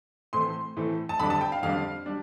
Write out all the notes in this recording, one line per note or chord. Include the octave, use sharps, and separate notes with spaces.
A2 E3 A3 C4 C6
A2 E3 A3 C4
A5
F2 D3 G3 D4 B5
A5
G5
F5
F2 D3 G3 D4 F5
G3 D4